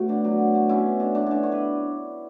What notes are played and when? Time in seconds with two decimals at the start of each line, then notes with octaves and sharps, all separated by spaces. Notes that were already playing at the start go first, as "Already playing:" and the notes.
Already playing: A2 A3 B3 F#4
0.08 D3 D4
0.24 F#3
0.39 D3
0.54 A3
0.69 B2 C#4 E4
0.85 A3
1.00 A3 D4
1.15 B2 D4
1.26 D3 C#4 D4
1.43 A3 C#5
1.52 B4